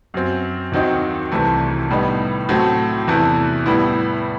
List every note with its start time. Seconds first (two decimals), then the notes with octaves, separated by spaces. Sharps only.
0.14 F#2 F#3 C4
0.72 D#2 D#3 F#3 C4 D#4
1.32 C2 C3 E3 A3
1.90 A2 G3 B3 D#4
2.49 A2 F#3 A3 C4
3.07 E2 C3 E3 A3 E4
3.66 A2 G3 B3 E4